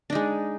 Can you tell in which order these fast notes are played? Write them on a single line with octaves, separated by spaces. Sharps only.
D4 D#4 G#3